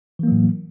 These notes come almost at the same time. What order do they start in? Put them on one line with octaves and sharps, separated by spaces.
E3 A#3 F#3 A2